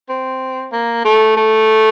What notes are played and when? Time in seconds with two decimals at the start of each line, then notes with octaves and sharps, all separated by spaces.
0.09 C4
0.72 A#3
1.05 A3
1.37 A3